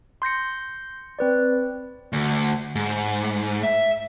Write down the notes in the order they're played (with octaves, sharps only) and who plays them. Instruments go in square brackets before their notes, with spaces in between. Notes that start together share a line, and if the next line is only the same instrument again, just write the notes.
[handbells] C6 G6 A#6 C#7
C4 B4 D5
[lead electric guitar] D2
G#2
E5